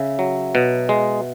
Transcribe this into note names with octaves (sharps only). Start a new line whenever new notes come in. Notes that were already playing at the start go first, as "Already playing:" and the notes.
Already playing: C#3 E5
F#3
B2
G#3